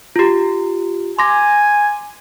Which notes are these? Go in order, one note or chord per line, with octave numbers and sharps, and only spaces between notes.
F4 G4
G#5 C6 D6 A#6